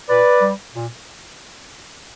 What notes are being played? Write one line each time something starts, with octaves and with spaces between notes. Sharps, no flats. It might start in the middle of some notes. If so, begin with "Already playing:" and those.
A#2 B4 D5
G3
A#2